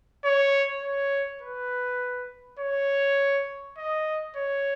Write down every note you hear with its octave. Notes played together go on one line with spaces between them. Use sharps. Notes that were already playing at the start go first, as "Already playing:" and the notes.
C#5
C#5
B4
C#5
D#5
C#5